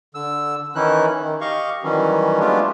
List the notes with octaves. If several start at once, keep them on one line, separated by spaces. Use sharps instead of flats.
D3 E6
D#3 E3 C#4 D#4 E4 F#6
D#3
G4 D#5 F5 C#6
D#3 E3 F#3 G3 C#4
G#3 A3 B3 D4 F4 G4